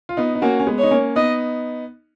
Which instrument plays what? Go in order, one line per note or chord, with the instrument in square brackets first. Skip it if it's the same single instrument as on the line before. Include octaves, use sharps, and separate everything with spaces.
[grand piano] F4
B3 D#4
D#4
[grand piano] A#3 C#4 [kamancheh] F#4
[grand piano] C#4
G#3 B3
[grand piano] D#4 [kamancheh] C#5
[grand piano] A#3 C#4
[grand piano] B3 D#4 [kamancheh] D#5